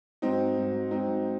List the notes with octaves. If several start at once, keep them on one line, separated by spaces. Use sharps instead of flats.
G#2 F#3 C4 D#4
G#2 F#3
G#2 F#3 C4 D#4